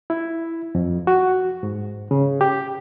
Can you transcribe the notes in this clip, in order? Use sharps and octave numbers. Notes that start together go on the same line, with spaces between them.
E4
F2
F#4
G#2
C#3
G4